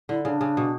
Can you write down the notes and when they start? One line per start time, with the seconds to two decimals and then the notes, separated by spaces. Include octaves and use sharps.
0.09 D3 E4
0.25 C#3 E4
0.29 D4
0.41 C#3
0.57 B2